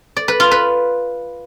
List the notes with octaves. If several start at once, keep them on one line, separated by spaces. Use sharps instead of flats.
D5
B4
F4
B4